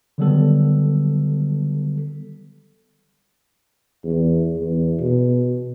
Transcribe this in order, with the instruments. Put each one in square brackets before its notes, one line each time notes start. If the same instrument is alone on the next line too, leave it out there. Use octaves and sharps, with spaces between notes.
[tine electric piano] D3 D#3 F#3 G3 B3 A4
[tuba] E2
E2
B2